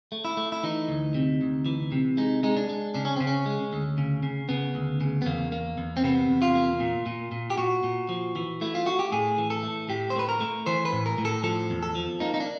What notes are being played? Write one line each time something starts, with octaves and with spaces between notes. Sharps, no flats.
A3
E4
A3
E4
E3 D#4
D2
C3
D2
E3
C3
G#3 D#4
G#3 D#4
D4
G#3
C#3 D4
C#4
C#3 C4
C#4
G#3
D2
C#3
C#3
C#3 B3
D2
C#3
B3
E2 A#3
A#3
E2
C4
C3 B3
E2
F4
A#3
A#2
A#2
A#2
G4
A#2 F#4
A#2
F3
E3
A3 E4
F4
A3 F#4
G4
A2 G#4
E3
A4
A3
A2 G4
C5
A3 B4
A#4
A3
E3 C5
B4
A2
A#4
A2
A4
F3 A4
E2
A4
F3
A#3 D#4
D#4
D4